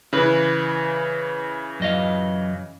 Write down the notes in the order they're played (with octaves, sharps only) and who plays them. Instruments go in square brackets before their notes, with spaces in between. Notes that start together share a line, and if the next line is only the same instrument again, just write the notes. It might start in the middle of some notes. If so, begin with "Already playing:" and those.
[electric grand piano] C#3 E3 [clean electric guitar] E4 B4
[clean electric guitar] F#2 D#5 F5